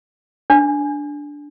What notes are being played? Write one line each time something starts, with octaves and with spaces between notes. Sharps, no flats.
D4